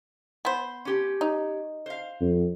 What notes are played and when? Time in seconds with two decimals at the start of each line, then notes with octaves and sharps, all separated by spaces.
0.45 B3 C5
0.85 C#4 G4
1.21 D#4
1.86 C5 F5
2.21 F2